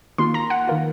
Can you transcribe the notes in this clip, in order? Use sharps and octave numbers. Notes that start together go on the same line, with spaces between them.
D#3 A#3 F4 C6
A#5
F#5
D#3 A#3 F4